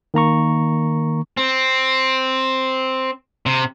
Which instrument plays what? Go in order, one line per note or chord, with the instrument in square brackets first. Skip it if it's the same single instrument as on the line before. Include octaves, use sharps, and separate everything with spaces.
[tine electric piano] D#3 A#3 A#5 C#6
[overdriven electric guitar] C4
C3